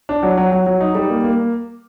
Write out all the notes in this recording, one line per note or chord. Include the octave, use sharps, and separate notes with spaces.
D4
F#3
F#3
F#3
F#3
D#4
G3
A#3
A#3